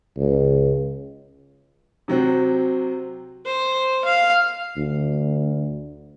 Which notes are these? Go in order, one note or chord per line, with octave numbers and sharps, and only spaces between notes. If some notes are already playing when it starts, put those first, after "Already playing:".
C#2
C3 F#3 C4 F#4
C5
F5
D2